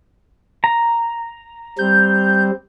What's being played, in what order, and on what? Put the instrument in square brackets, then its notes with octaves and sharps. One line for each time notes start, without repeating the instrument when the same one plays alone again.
[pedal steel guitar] A#5
[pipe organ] G3 C4 [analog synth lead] G6